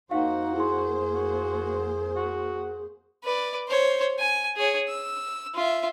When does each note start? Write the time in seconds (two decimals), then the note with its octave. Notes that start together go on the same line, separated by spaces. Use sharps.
0.11 F2 A#3 D#4 F#4 C5 F5 F#5
0.56 E4 G#4 C6
1.14 F#4
2.16 F#4
3.24 B4 D5
3.68 C5 C#5
4.19 G#5
4.56 G#4 C#5
4.89 E6
5.54 F4 E5